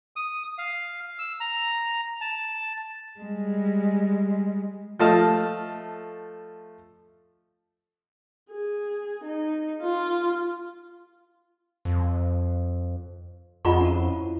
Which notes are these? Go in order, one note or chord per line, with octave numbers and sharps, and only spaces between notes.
D#6
F5
E6
A#5
A5
G3 G#3
F3 A3 D#5 A5 F6
G#4
D#4
F4
F2
F2 F4 G#4 D#5 F#5 A#5 C#6
C#4 E4